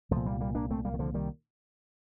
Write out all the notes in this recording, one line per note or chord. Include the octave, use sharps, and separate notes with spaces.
C2 A#2 F3 A3
G3 A#3
G3 A#3
A#3 D4
A3 C4
G3 A#3
D#3
D3 F3
D#3 G3